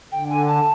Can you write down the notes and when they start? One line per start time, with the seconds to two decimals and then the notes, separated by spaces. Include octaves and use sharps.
0.12 D3 G5
0.30 G#5
0.48 A5